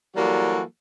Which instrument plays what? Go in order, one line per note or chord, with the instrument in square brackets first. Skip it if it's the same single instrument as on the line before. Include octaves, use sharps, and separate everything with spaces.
[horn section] E3 F#3 G3 A#3 F#4 A4